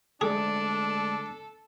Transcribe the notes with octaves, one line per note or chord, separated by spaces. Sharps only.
D2 G#3 D4 G#4 A4 D5